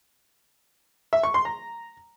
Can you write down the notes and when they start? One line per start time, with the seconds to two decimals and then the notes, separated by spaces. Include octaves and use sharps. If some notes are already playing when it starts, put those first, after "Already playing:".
1.13 E5
1.23 C#6
1.34 C6
1.45 A#5